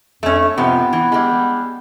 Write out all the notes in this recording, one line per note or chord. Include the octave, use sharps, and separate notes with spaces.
F2 A3 C#4
G#2 C3 F3 B3
E3
G3 G#3